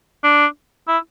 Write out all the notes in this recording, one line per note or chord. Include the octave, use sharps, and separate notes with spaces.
D4
E4